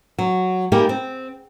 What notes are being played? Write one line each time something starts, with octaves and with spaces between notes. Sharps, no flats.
F#3
G3 A#3 D#4 G4 G#4 A#4
C4